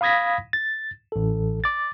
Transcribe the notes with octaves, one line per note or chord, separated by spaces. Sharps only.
F5 B5 D#6 G#6 A#6 B6
A6
A1 A4
D6 A6